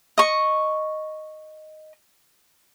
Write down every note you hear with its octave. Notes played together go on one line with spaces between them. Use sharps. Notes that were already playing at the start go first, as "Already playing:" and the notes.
D#5 C#6